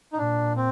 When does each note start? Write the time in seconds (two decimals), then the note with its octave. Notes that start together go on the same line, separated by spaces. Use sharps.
0.13 D#4
0.17 A#2 D4
0.56 C4